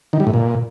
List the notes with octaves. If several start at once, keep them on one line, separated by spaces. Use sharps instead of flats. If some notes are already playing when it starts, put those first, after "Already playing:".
D#3
G3
A2
A#2